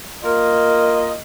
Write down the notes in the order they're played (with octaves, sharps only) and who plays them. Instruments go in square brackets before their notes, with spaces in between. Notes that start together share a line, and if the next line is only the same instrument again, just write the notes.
[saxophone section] A#3 F4 A#4 [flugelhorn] D#5